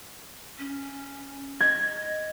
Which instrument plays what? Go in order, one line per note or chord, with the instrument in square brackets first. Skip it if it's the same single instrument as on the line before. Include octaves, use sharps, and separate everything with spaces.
[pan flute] C#4
[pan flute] D#5 [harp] G#6